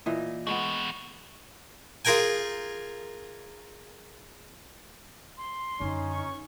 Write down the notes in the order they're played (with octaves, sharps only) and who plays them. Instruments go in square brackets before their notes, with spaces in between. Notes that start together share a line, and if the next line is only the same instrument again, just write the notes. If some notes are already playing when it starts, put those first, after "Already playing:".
[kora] A#2 E3 D#5
[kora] G#3 B3 [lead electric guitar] E4 F#4
[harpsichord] F4 G#4 A#4 G5 G#5
[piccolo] C6
[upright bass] F#2 D3 [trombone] C#4 [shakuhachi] D#4
[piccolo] C#6